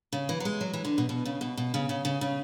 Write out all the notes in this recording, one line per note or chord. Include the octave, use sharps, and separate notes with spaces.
C#3
E3
F#3
G#3
F#3
E3
D3
B2
B2
C#3
B2
B2
C#3
C#3
C#3
C#3